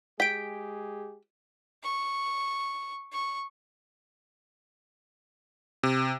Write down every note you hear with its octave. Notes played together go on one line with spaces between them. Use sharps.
G#3 G4 G#4 G5 B6 D7
C#6
C#6
C3